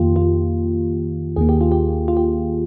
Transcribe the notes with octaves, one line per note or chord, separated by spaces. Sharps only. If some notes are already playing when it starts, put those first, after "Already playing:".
Already playing: F2 D#3 A#3 F4 G4
F4
D#2 D#3 A#3 G#4
G4
F4
G4
F4
G4